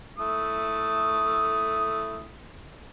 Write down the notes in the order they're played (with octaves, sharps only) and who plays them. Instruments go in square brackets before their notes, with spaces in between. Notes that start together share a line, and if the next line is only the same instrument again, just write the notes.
[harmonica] A3 E4 D#6